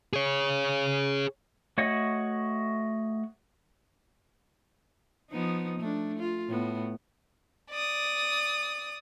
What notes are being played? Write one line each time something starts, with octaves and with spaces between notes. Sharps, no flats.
G#4 C#5
A3 F#4 C#5 D#5 F#5
F3 B3 D#4
A3 D4
F4
A2 B3
D5 D#6